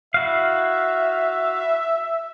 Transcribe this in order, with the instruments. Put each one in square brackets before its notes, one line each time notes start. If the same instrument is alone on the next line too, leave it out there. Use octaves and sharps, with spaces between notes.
[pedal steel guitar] E4 F#4 F5 [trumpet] E5